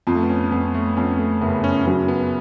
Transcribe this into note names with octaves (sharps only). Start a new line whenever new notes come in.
F2 F4
A3
B3
C#4
F2 B3
A3
F2 C#4
A3
F#1 B3
C#4
F#3 C#4
B3